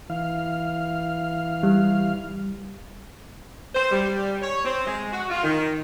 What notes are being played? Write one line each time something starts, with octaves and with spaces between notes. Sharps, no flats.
E3 F5
G3
C5
G3
C#5
C4
G#3
F#4
F4
D#3